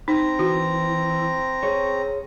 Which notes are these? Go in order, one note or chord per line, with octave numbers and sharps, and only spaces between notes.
C4 D#4 A#5
E3 F#4
G#4 C#5